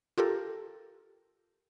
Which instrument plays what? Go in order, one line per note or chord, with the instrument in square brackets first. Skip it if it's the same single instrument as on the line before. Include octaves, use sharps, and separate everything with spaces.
[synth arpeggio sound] F4 G4 A4 A#4